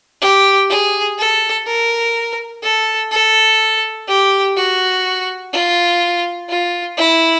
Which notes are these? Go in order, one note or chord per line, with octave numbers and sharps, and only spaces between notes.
G4
G#4
A4
A#4
A4
A4
G4
F#4
F4
F4
E4